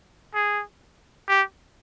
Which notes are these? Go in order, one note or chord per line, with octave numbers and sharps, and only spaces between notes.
G#4
G4